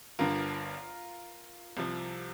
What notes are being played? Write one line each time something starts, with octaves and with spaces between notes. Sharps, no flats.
G1 G2 D3 F4 A#4
C2 C3 F3